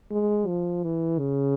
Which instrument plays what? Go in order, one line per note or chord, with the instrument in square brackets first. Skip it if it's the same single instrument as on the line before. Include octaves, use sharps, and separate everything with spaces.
[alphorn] G#3
F3
E3
C#3